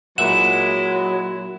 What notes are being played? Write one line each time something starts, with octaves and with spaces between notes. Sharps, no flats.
A#2 F#3 G#3 E4 E5 F#5 E7